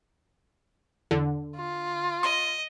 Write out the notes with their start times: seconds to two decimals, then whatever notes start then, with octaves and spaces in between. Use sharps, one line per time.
1.11 E2 D3
1.56 F4
2.23 D#5 C6